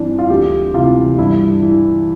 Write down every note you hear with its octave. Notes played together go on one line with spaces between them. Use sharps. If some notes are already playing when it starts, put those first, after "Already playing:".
Already playing: G2 E3 C4 D4
F4
D2 G4
C3 E3 F4
G2 E4
E3